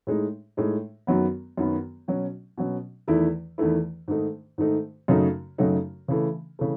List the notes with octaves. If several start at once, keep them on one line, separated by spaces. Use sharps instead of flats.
A2 G#3 D#4
A2 G#3 D#4
F#2 D#3 F#3 B3
F#2 D#3 F#3 B3
B2 F#3 C#4
B2 F#3 C#4
E2 D#3 A3 E4
E2 D#3 A3 E4
G#2 D#3 A3 D#4
G#2 D#3 A3 D#4
F#2 C#3 F#3 A3 D#4
F#2 C#3 F#3 A3 D#4
C#3 E3 A3
C#3 E3 A3